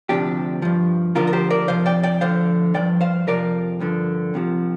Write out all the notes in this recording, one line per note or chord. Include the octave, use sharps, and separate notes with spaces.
D2 C3 F3 D4 G4
G2 F3
D2 D3 F3 F4 A#4
A#4
G4 C5
A#4 D5
F2 C3 F3 C5 F5
D5 G5
D5 G5
D2 D3 F3 C5 F5
G2 F3 D5 G5
C5 F5
F2 C3 F3 A#4 D5
G2 D3 F3
C2 C3 F3